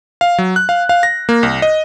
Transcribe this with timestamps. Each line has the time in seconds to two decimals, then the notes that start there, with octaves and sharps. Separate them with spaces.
0.21 F5
0.38 F#3
0.56 F#6
0.69 F5
0.89 F5
1.03 A#6
1.29 A#3
1.43 C2
1.62 D#5